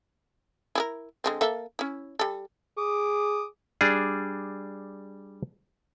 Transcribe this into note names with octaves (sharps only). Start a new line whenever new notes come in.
E4 G4 A#4
D3 G#3 C4
A#3 A4 E5
C#4 E4
G3 A4
G#4 D6 D#6
G3 D4 G#4